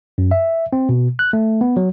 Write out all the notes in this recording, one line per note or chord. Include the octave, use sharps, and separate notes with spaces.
F#2
E5
C4
B2
F#6
A3
B3
F#3